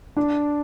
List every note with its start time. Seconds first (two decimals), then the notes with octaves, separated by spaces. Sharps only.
0.17 D4